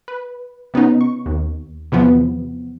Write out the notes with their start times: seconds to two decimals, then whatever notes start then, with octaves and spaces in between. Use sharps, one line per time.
0.08 B4
0.74 C3 B3 C#4 D#4
1.01 C#6
1.26 D#2
1.92 E2 C3 E3 F3 B3